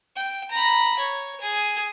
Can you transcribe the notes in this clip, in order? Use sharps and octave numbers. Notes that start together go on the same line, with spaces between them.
G5
A#5 B5
C#5
G#4